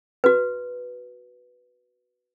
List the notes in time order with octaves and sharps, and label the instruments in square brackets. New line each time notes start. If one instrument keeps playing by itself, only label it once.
[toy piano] F#4 B4